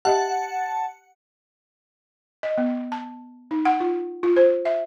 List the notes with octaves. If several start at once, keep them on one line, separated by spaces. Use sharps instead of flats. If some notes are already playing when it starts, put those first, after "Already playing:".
G4 D#5 E5 F#5 A5
D#5
B3
A5
D#4
F#5
F4
F4
C5
E5